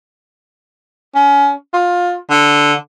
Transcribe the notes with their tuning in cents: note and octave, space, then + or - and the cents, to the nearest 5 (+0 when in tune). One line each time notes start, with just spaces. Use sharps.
C#4 +25
F4 +20
D3 -5